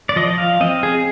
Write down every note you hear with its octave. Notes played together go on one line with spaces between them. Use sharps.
D5
F3 D#5
F5
C4 D#5
G#4